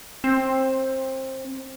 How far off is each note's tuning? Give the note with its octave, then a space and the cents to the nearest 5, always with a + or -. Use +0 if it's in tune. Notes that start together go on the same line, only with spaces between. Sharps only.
C4 +20